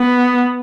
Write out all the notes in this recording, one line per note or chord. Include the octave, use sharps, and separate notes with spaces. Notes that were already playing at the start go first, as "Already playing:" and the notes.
Already playing: B3